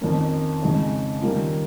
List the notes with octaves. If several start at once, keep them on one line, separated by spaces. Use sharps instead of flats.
F2 D#3 A#3 C#4
F2 C#3 G#3 D#4
D#3 G3 A#3 C#4 F4